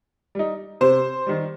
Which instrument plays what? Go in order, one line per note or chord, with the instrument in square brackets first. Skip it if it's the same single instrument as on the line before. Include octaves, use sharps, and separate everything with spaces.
[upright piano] G3 D#4
[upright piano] C3 [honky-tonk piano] C5
[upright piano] D#3 G3